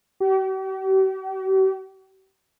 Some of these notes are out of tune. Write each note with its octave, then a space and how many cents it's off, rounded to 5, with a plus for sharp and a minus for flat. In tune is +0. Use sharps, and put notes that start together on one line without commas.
G4 -45